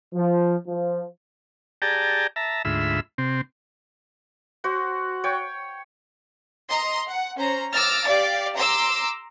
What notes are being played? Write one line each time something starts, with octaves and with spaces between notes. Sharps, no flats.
F3
F3
G4 G#4 D5 G5 A5 A#5
E5 A5 A#5
D2 G#2 F4 E5 B5 E6
C3 C4
F#4 C5
C#5 G5
D#5 A#5 C6
F#5
C#4 C5 A#5
D6 E6 F6 A6 A#6
G4 D5 F5
A#5 C6 D6 E6